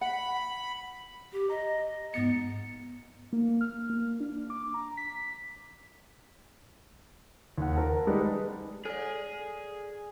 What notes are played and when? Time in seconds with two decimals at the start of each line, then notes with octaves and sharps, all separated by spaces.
0.01 F#5 B5
1.33 G4
1.50 D#5 A#5
2.14 G#2 B3 A6 C#7
3.33 A#3
3.61 F6
3.90 A#3
4.20 D4
4.50 D6
4.74 A#5
4.97 B6
7.58 D#2 F#5
7.75 A#4 A5
8.07 G3 G#3 D#4 B4
8.85 G#4 A4 D5